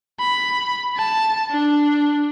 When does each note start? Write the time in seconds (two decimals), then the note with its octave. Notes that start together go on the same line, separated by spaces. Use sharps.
0.20 B5
0.97 A5
1.50 D4